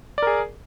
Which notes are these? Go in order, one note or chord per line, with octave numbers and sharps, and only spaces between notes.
G#4 A#4 D5